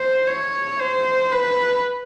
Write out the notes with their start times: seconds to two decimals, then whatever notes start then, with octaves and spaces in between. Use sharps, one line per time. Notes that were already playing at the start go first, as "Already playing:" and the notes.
Already playing: C5
0.28 C#5
0.79 C5
1.31 B4